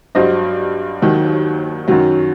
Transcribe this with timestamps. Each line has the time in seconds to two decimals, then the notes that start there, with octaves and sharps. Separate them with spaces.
0.15 G2 F#3 C5 D#5
1.02 D#2 D#3 F#3
1.88 F#2 D#3 F#3